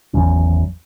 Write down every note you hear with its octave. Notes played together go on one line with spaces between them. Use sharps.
G#1 E2 F#3 C#4